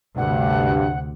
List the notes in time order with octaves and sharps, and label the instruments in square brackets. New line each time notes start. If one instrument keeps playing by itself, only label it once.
[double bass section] D2 C3 [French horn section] G2 [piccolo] F#5